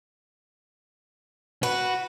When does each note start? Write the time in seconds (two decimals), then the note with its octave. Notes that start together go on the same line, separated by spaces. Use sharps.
1.63 F#4 B4